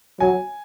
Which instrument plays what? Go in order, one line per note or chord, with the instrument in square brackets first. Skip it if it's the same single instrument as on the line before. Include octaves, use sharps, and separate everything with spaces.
[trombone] F#3 [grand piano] G#5